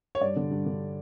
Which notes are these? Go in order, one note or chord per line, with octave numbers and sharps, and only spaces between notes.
C#5
G2 D5
D3
G2
D3